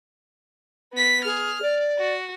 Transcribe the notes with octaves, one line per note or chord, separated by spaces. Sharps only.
B3 B6
G#4 F6
D5
F#4